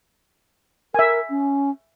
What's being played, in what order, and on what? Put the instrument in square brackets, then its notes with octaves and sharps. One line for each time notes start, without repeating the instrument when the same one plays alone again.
[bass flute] A#4 [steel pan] E5 G#5
[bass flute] C#4